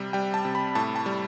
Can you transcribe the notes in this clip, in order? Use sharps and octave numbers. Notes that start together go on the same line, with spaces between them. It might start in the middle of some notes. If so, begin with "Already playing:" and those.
Already playing: C3 G3
G3 G5
A5
C3
B5
A2 A5
A5
G3